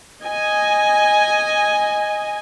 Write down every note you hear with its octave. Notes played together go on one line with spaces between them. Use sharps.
D#5 G#5